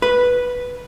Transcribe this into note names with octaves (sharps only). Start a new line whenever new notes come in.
B4